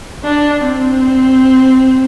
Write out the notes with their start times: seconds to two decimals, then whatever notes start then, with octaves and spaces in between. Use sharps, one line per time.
0.23 D4
0.63 C4